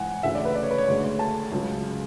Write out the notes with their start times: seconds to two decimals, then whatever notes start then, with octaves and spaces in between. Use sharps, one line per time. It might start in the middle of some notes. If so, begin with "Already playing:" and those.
Already playing: G#2 E3 F#5 G#5
0.23 D2 C#3 E3 E5
0.35 D5
0.45 B4
0.55 D5
0.63 C#5
0.71 B4
0.78 C#5
0.88 D2 D3 G#3
1.19 A5
1.52 C#2 C#3 F#3